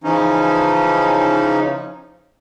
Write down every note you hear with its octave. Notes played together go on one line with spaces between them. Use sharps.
C#3 E3 F3 C#4 D#4